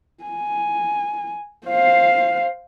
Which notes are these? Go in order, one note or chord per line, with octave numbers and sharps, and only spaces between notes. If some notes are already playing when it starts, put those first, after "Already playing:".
G#5
C5 F5